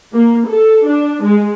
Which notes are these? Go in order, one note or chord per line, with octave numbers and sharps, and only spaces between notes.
A#3
A4
D4
G#3